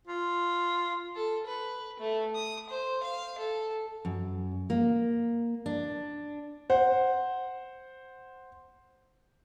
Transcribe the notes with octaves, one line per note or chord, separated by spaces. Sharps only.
F4
A4
B4
A3
D#6
C5
F5
A4
F#2
A#3
D4
C5 F#5